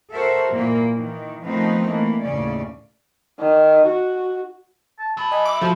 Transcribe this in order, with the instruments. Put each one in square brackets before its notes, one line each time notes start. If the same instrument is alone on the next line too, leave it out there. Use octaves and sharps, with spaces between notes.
[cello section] F#4 A4 A#4 C5 E5
A#2 E3 A#3
D#3 E3
D#3 F3 A3 B3 C4 D#4
E3 A3 A#3
D#2 A2 C#3 C#4 D5
[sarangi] D#3
F#4
[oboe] A5
[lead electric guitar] F#3 B4 [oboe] A5
[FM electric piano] D#5 G#5 B5
[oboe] E5 [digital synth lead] D6
[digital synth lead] F3 [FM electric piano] F#4 A4